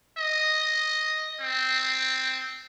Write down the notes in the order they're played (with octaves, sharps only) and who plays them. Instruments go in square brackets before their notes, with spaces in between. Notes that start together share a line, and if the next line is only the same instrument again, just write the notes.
[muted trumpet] D#5
C4